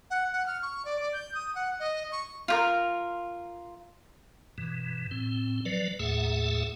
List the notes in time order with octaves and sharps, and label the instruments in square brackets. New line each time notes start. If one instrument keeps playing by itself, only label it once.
[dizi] F#5
F#5
F6
C#6
D5
D5
G6
D#6
F#5
D#5
C#6
[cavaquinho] F4 G4 A#4
[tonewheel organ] G2 B2 E3
A2 C4
F3 F#3 B4 D5
D#2 A2 A3 G#4 E5 F#5